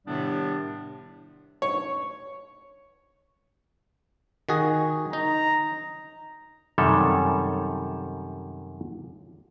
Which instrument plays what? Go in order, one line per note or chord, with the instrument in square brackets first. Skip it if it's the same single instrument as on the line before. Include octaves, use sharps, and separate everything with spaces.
[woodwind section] A2 C3 D#3 G3 B3 D4
[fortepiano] C#5
[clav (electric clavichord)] D#3 F#4 G#4
[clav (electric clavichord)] D#4 [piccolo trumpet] A#5
[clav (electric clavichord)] F#2 C3 D#3 G3 A4 C#5